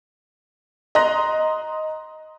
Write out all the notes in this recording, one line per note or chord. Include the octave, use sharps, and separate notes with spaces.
D#5 A#5 C6 F#6 A#6